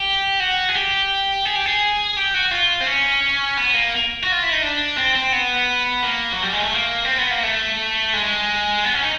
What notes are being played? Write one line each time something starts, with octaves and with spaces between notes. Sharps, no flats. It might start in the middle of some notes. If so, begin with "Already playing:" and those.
Already playing: G4
F#4
G#4
G4
G#4
G4
G#4
G4
F#4
F4
C4
C#4
B3
A#3
F#4
F4
E4
D#4
D4
C4
C4
B3
A#3
F#3
G3
G#3
A3
A#3
C4
B3
A#3
A3
G#3
B3
C#4
D#4